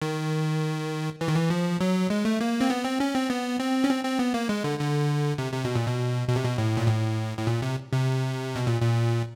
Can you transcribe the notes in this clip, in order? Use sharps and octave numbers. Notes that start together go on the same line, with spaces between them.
D#3
E3
D#3
E3
F3
F#3
G#3
A3
A#3
C4
B3
C4
C#4
C4
B3
C4
C#4
C4
C4
B3
A#3
G#3
D3
D3
C3
C3
B2
A#2
B2
B2
C3
B2
A2
A#2
A2
A2
A#2
C3
C3
B2
A#2
A#2